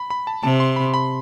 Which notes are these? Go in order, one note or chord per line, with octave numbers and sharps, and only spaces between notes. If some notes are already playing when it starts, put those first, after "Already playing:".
Already playing: B5
B5
A5
C3 A5
C6
B5
B5